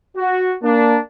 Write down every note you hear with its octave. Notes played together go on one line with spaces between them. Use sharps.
F#4
A#3 D4